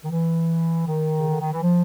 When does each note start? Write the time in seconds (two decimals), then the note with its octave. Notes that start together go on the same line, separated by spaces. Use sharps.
0.04 D#3
0.11 E3
0.86 D#3
1.19 C#3
1.30 D3
1.41 D#3
1.52 E3
1.63 F3